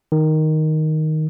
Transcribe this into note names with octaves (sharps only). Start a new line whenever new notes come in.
D#3